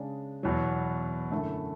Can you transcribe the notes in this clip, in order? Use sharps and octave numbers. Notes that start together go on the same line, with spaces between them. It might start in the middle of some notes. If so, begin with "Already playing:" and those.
Already playing: C#3 G#3 D4
E2 B2 F#3
F#2 D3 A3 E4